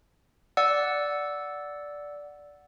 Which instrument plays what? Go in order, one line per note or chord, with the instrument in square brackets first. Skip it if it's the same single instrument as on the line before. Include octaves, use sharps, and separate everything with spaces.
[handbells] D5 F#5 E6